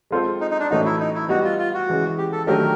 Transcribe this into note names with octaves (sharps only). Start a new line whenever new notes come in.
G#3 C4 F4 A4 C5
D#4
D#4
D4
A2 E3 A3 C#4 D#4 F#4
E4
D#4
E4
G3 B3 D#4 F#4
F4
F4
F#4
C#3 E3 G#3
G4
A4
D#3 F#3 A3 D4 G4 A#4